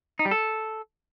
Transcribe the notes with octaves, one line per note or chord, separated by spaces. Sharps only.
D#4
G3
A4